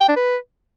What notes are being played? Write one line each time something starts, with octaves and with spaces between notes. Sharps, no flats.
G5
D4
B4